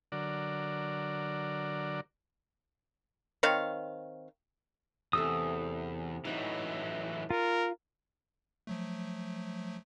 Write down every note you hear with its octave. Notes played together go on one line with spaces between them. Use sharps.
D3 F#3 A#4 D5
D#3 C4 C#5 F5
E2 C3 A3 A4 D#6 E6
A2 E3 F#3 D#4 C#5 D#5
F4 A#4
F3 F#3 A3